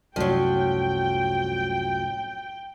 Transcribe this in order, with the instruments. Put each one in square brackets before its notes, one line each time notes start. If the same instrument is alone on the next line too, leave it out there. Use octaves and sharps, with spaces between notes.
[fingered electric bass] C2 F#2 A2 [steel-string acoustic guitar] F3 F#3 [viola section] G5